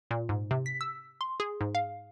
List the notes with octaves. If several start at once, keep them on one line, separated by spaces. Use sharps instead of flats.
A#2
G#2
C3
B6
E6
C6
G#4
G#2
F5